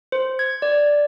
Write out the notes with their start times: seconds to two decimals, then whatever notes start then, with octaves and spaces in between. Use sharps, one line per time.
0.12 C5
0.39 G#6
0.62 D5